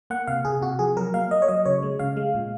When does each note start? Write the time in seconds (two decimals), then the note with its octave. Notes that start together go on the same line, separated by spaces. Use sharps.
0.10 A#3 F#5
0.27 C3 F5
0.45 C3 G#4
0.62 C3 F#4
0.79 F3 G#4
0.96 F#3 A#4
1.14 A#3 F5
1.31 A#3 D#5
1.42 C#5
1.48 F#3 D#5
1.66 C#3 C#5
1.83 G#3
1.99 C#3 F5
2.17 G#3
2.35 A#2